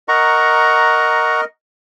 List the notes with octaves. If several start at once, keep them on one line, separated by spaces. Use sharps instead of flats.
A#4 D#5 F#5 A#5 C#6